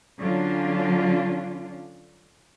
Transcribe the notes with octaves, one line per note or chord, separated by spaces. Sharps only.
D3 F#3 C#4 D4 F4